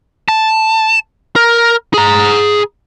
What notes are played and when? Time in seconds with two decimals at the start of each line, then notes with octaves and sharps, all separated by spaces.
0.29 A5
1.36 A#4
1.94 G#4 A#5